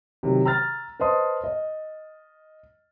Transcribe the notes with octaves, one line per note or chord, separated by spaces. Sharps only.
C3 D#3 F#3
A#5 E6 F6 A6
B4 C5 D#5 A5 C6 D#6
D#5